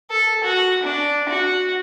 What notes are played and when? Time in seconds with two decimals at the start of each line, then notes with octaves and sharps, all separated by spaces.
0.11 A4
0.44 F#4
0.83 D4
1.29 F#4